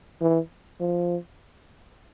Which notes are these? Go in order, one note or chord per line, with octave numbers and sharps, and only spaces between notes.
E3
F3